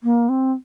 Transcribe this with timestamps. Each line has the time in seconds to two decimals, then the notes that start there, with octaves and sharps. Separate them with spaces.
0.03 A#3
0.29 C4